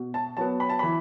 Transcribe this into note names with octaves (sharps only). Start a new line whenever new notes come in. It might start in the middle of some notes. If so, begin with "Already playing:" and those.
Already playing: B2
A5
F#3 B3 A5
B5
A5
E3 B5